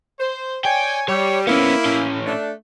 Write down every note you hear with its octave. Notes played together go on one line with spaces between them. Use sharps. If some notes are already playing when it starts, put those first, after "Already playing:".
C5
C#5 D5 G5 G#5
G3 C#5
A#3 B3 C#4 E4
A2 C#4
A3 D4